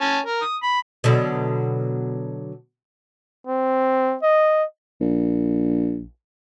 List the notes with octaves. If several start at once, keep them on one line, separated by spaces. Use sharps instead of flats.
C#4 A5
A#4
D#6
B5
B2 D3 F#3
C4
D#5
A#1